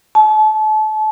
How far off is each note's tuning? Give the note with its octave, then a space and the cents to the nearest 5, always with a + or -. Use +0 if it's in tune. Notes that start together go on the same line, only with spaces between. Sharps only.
A5 -30